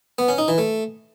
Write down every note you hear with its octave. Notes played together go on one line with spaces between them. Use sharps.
B3
C#4
D#4
E3
A3